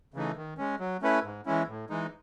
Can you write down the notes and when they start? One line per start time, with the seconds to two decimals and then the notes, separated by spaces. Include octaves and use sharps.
0.14 C#3 E3 A3 D#4
0.37 D#3
0.58 G#3 C#4
0.80 F#3
1.02 A3 C#4 E4 B4
1.24 G#2
1.46 E3 G#3 C#4 E4
1.68 A2
1.90 E3 G#3 D#4